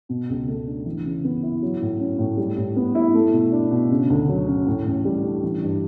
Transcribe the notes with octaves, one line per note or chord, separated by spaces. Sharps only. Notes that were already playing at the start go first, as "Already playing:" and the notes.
B2
C#2
A3
D4
E3
C#3
B3
E4
F#3
A2
C#4
A2
G3
A2
B3
E4
A3
B2
D4
B2
C#3
D2
F#3
C#4
A2
A1
G3
D4
E3
G2